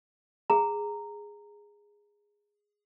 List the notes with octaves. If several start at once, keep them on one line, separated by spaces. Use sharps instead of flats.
G#4 A#5